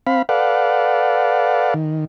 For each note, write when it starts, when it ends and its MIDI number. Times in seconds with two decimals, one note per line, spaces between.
0.07 0.22 60
0.07 0.22 77
0.07 0.22 83
0.29 1.74 69
0.29 1.74 71
0.29 1.74 74
0.29 1.74 77
0.29 1.74 78
1.74 2.05 51